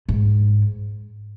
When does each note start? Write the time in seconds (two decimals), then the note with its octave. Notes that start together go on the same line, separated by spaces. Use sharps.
0.09 G#2